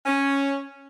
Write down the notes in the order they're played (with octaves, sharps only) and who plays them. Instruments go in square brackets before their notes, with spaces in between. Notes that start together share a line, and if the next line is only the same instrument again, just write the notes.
[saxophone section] C#4